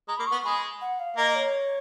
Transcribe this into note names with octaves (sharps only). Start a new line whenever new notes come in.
G#3 A#5
A#3 B5
C#6
B3
G#3 G#4 B5
F#5
F5
A#3 A#4 D#5
C#5